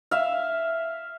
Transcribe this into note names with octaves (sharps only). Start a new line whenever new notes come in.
E5 F5